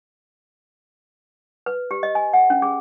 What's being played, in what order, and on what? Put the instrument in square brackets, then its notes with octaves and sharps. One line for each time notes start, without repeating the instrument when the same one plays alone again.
[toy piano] B4
G4
D#5
G#5
F#5
C#4
G#4